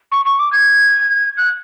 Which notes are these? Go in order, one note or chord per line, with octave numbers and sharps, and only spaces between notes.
C#6
C#6
D6
G#6
F#6